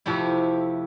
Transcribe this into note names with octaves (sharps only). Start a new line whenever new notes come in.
F2 C3 F3 A3 E4 G4